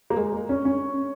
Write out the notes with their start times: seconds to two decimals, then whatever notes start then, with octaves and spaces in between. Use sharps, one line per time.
0.10 A#3
0.16 G#3
0.32 A#3
0.49 C#4
0.65 C#4